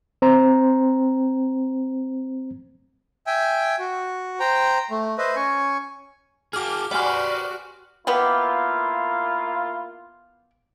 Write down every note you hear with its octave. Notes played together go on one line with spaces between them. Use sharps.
C4 C5 A#5
E5 G5 G#5
F#4
C5 G5 A#5
A3
B4 C5 D#5 E5
C#4 G#5 C#6
F#4 G#4 D6 F6
F#4 G4 B4 C5 D5 F#5 G#5 F6
A#3 B3 E4 F4 G4